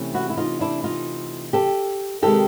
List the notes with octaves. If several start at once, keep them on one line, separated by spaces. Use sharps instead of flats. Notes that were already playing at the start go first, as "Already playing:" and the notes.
Already playing: C3 E3 A3 C#4
E4 F#4
E4
D#4 F4
D4 E4
D#4 F4
G4 A4
C3 D#3 G#3 G4 A4